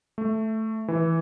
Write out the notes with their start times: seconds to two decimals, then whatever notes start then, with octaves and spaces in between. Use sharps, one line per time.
0.18 A3
0.88 E3